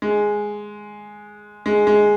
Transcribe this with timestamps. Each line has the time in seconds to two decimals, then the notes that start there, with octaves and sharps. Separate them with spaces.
0.02 G#3
1.66 G#3
1.87 G#3